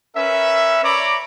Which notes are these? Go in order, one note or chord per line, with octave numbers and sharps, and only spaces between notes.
C#4 A#4 B4 E5
C#5 D5 A#5 B5 D6